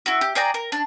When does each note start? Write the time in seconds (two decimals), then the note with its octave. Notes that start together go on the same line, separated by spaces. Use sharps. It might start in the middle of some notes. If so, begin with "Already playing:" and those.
0.06 E4 F#4
0.21 G4
0.35 G#4 D5 G5 A#5
0.54 A#4
0.72 D4